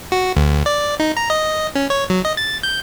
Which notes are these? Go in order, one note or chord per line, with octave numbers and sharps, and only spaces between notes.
F#4
D2
D5
D#4
A#5
D#5
C#4
C#5
F#3
D#5
A6
G6